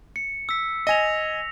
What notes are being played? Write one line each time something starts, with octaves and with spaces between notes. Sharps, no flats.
C#7
E6 B6
D#5 G#5 A#6 F7